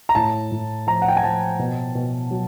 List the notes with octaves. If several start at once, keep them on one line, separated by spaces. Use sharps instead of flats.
A#5
A2 A5
A2
F3 A#5
F#5
G5
G#5
F3 A5
B2
B2
F#3